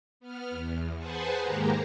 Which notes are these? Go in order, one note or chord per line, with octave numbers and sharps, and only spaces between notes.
B3 F6
E2
G#4 B4 C5 F#5 G#5 A5
G#2 D#3 G#3 A#3 G4 A#5